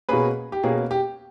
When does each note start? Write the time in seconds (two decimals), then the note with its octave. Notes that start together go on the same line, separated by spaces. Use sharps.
0.09 B2 A#3 C#4 G#4 B4
0.52 G4
0.63 B2 A#3 C#4 G#4
0.91 G4